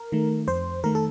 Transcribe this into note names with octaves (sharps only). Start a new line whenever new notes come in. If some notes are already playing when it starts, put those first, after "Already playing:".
Already playing: A#4
D#3 A3
F2 C5
D#3 A3 A#4
A4